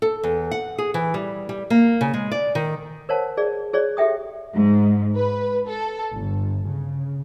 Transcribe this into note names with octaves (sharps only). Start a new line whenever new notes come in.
A4
E2
F#5
G#4
E3
G3
G3
A#3
C#3
G#3
D5
D#3
A#4 C5 C#5 F#5 A5
G#4 D5
G#4 C#5 D5
G4 A4 E5 G5 D#6
G#2
B4
A4
G1
C#3